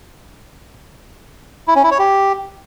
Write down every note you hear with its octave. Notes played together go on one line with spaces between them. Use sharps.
E4
C#4
E4
C#5
G4